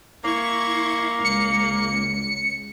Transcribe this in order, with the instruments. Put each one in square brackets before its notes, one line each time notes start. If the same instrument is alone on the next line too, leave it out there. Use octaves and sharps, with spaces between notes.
[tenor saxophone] A#3 [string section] E4 C#6 G#6
[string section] C#2 [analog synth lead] C#7